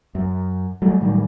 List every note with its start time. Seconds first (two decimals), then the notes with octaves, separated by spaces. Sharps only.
0.15 F#2
0.82 F#3 G3 A3
1.01 A2 D#3 F#3 G3